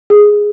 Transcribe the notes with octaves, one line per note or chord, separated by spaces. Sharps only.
G#4